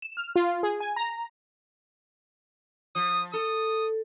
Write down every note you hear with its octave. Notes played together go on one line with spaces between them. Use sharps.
E7
F6
F4
G#4
G#5
A#5
F3 D#6
A4 D#6